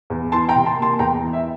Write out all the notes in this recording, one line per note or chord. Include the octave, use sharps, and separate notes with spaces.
E2
E3 A5 C6
G5 A#5
C3
A5 C6
A#3
A5 C6
E2 G5 A#5
E3
E5